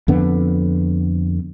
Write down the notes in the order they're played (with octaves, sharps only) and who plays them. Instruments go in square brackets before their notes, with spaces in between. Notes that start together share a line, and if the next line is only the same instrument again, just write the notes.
[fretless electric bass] F2 D3 B3